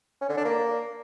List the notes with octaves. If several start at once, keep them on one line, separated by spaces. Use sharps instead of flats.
C#4
D3
D4
A#3